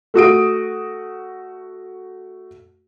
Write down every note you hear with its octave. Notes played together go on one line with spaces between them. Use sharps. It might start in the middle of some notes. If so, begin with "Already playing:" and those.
A3 F#4 D#6 D7